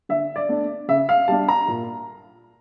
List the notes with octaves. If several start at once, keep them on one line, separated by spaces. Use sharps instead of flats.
D3 E5
D5
A3 D4
C#3 E5
F5
G3 D4 A5
A#5
A#2